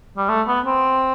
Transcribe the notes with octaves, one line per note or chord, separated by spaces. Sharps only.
G3
A3
B3
C4